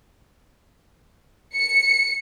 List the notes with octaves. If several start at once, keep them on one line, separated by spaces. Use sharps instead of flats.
C#7